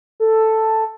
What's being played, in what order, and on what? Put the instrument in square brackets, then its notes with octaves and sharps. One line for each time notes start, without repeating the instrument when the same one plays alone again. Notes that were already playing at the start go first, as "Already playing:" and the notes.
[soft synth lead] A4